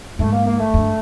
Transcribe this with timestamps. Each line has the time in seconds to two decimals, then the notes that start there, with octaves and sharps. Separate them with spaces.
0.19 G#2 A3
0.33 A#3
0.47 A#3
0.60 A3
0.74 G2